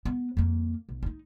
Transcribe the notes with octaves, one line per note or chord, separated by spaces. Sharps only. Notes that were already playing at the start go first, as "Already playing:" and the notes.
B3
F2 A#3
B1
C#4 D#4